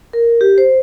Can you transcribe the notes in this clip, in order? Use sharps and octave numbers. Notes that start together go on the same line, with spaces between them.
A#4
G4
C5